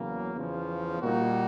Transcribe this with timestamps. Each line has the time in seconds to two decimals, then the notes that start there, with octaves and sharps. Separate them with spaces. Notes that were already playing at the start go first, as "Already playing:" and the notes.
Already playing: E2 C#3 F#3 A#3
0.35 E2 C#3 F3
1.01 A#2 G3 A#3 D#4 F#4